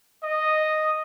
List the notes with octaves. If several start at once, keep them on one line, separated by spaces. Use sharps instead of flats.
D#5